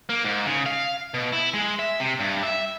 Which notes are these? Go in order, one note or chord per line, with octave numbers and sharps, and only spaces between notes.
A#3
G#2
C#3
F5
B2
E4
G#3
E5
C3
G2
E5